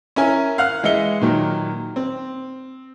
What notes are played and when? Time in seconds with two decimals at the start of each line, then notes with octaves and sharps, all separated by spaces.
0.16 C#4 E4 A#4 G#5
0.58 F5 F#5 F6 F#6
0.83 E3 G#3 D#5 E5 C#7 G7
1.21 A#2 D#3 F#3
1.96 C4